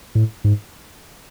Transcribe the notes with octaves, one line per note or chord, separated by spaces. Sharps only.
A2
G#2